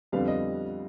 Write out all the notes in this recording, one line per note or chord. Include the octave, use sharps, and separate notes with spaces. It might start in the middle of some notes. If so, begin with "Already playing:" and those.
F2 D3 G3 B3 F5
D#5